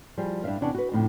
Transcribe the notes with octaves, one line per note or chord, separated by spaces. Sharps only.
F3 G3 G#4
G2 D4 B4 E5 F5
E2 C3 C#4 D4 F#5 A5
F#4 B4
F2 A2 C#3 D4 D#4